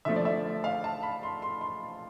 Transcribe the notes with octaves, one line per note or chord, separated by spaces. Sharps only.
D3 F3 A3 E5
D5
E5
F5
A5
B5
C6
C6
C6